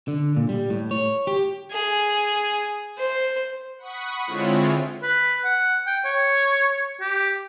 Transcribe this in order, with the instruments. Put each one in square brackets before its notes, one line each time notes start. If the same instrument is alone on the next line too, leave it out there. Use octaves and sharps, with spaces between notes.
[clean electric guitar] D3
A#2
G3
A2
C#5
G4
[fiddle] G#4
C5
[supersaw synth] F#5 B5 C#6 D#6
D3 G#3 C4 E4 F4 C#5
[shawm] B4
F#5
G5
C#5
G4